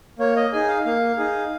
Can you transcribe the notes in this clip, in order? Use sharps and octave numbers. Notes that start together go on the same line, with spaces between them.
A#3 C#5
D#5
D#4 G#4 G#5
F5
A#3 F5
D#4 G#4